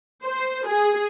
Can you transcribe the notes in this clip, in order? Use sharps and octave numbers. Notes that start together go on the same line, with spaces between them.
C5
G#4